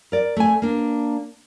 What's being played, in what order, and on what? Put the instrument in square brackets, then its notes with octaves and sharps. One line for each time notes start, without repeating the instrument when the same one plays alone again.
[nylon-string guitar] A#4 D5
A3 G#5
A#3 D4